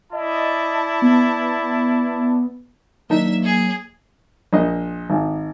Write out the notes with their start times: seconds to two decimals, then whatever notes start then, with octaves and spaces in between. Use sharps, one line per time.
0.13 E4 D5 D#5 A5
1.02 B3
3.10 D#3 F#3 A#3 D4 D#4 E5
3.44 G#4
4.53 A#1 D#5
5.10 G#1